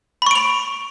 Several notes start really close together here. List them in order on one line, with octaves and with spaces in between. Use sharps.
B5 C#6 D7 F7